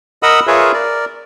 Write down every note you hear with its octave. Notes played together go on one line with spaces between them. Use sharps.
A#4 D#5 F#5 B5 D#6 E6
F4 G#4 A#4 B4 C#5 E5
A#4 D5